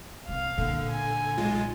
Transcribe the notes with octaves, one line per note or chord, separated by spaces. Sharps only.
C3 F5
A#2 D3
G#5
B1 G#3 F4